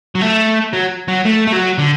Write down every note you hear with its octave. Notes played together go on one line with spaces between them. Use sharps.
F#3
A3
F#3
F#3
A3
A3
F#3
D3